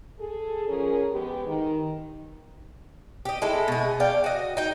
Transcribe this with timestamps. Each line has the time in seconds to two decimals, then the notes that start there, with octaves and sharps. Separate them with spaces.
0.20 G#4 A4
0.69 F3 C#4 G#4 A#4
1.11 G#3 B3 G4
1.47 D#3
3.25 G4 D#5
3.42 G#3 E4 A4
3.68 B2 G#4
4.00 D5 F5 G5
4.24 F#4 D#5
4.57 D#4 G5